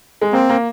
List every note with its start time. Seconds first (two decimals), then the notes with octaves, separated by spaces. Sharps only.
0.22 G#3
0.33 A#3 C4
0.49 A#3